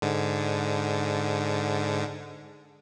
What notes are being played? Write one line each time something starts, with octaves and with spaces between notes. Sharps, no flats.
G#2 D3